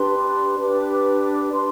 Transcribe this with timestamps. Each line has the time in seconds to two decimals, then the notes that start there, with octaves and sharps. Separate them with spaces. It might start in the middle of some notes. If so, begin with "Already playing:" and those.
Already playing: D4 G4 B4 C6
0.59 D4 G4 B4 D6
1.52 D4 G4 B4 C6